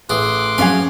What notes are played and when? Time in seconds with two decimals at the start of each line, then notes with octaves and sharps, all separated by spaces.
0.10 A1 G#4 C6 D6 F#6
0.58 F3 F#3 C#4 G#4 F5 G#5